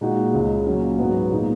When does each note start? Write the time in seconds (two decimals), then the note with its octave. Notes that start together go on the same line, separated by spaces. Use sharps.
0.01 A#2 G#3 D#4 F#4
0.33 C#2 C#3 G#3
0.66 A#2 F#3 C#4
0.98 G#2 F#3 B3 F#4
1.31 A#2 G#3 D#4